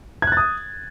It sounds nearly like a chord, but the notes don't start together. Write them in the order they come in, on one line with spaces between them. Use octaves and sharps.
G#6 F#6 A6 D#6